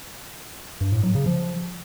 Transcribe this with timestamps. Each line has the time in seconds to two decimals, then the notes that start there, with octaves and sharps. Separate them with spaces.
0.81 G2
0.92 A2
1.03 F#3
1.15 C#3
1.26 F3